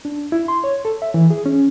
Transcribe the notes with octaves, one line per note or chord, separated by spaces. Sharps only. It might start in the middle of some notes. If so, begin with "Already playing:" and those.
D4
E4
C6
C#5
A4
E5
E3
G#4
C#4